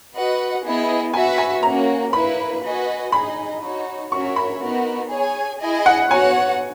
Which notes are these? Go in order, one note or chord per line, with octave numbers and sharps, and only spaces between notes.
F#4 B4 D#5 F#5
B3 E4 G#4 D#5
F#4 B4 E5 G#5
G#5
A#3 C#4 F#4 A#5
A#3 E4 B4 B5
F#4 B4 D#5 G#5
D#4 G#4 D#5 B5
D#4 F#4 C#5
C#4 F#4 A#4 C#5 E5 C#6
B5
B3 D#4 F#4 A#4
G#4 C#5 G#5
E4 G#4 D#5 G#5
F#5
B3 F#4 C#5 F#5 G#5